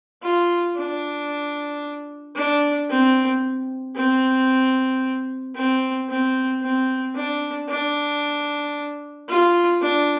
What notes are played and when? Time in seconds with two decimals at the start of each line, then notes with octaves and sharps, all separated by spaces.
0.23 F4
0.77 D4
2.36 D4
2.90 C4
3.96 C4
5.56 C4
6.09 C4
6.63 C4
7.15 D4
7.69 D4
9.29 F4
9.82 D4